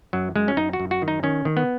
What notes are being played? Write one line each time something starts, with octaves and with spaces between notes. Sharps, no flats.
F#2 F#3
F#2 G#3
C#4
F#2 D#4
F#4
F#2
F#4
D#3
D#4
D#3 C#4
D#3
B3